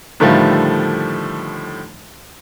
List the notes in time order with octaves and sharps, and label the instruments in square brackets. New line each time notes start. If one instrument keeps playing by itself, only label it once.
[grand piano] A2 D3 D#3 F3 G3 A3